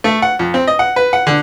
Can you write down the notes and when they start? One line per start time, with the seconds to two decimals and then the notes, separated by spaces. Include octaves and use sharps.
0.04 A3
0.22 F#5
0.39 F2
0.54 C4
0.67 D#5
0.79 F#5
0.96 B4
1.13 F#5
1.27 D3